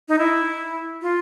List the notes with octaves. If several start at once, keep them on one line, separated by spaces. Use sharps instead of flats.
D#4
E4
F4